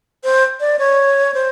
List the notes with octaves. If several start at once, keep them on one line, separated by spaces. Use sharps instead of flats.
C5
D5
C#5
C5